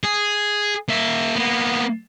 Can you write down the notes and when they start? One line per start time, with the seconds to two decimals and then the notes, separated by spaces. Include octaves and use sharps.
0.04 G#4
0.89 A#3 E5
1.36 A#3 B3